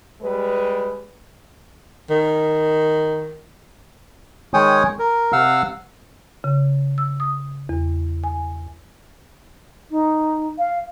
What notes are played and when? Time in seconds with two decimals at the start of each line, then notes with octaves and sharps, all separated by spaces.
0.22 G3 G#3 B4
2.10 D#3
4.54 D#3 G#3 C#5 G5 G#5 D#6
4.99 A#4
5.33 C3 F5 F#5 E6 F6
6.44 C#3
6.98 E6
7.20 D#6
7.69 E2
8.24 G#5
9.90 D#4
10.58 F5